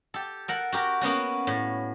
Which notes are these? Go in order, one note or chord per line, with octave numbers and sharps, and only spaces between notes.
G4 A4
A4 A#4 F#5
F#4 G4 A#4
A#3 B3 C#4 F#4
A2